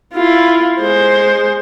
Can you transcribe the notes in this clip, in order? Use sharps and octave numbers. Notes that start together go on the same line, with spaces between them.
E4 F4
G#3 C5